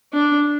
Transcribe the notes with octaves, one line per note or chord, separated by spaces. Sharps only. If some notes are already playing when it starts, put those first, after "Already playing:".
D4